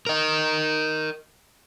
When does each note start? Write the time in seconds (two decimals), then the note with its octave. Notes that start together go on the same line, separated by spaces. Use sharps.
0.07 A#4 D#5